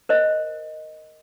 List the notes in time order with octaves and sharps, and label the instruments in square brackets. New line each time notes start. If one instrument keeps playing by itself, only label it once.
[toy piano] A#4 C5 D#5